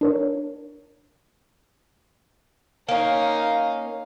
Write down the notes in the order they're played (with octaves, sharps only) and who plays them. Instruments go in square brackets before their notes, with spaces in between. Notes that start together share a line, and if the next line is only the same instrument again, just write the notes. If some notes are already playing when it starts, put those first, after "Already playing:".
[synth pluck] D4 A#4 C#5
[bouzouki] A#3 C#4 [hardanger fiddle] D#4 F5